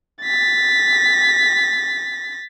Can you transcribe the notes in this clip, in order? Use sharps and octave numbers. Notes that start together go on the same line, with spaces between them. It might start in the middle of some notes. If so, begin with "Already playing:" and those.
A6 B6